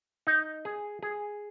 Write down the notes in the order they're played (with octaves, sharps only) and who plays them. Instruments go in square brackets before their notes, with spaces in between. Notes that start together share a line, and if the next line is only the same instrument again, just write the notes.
[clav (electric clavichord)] D#4
G#4
G#4